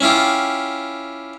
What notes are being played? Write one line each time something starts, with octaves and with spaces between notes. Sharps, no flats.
C#4 E4 F4 G4